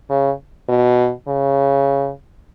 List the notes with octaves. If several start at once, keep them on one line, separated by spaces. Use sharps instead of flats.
C#3
B2
C#3